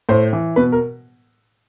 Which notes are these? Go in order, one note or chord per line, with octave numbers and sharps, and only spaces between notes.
A2 C5
E3
B2 B4
A#4